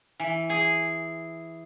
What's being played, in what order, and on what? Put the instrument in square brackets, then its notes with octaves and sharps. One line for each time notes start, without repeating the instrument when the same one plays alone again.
[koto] E3
G#4